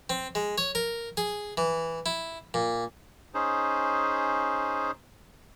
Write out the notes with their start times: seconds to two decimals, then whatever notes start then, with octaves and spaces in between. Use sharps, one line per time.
0.10 C4
0.35 G#3
0.58 C#5
0.75 A#4
1.17 G#4
1.58 E3
2.06 E4
2.54 A#2
3.34 C#4 D#4 G#4 C5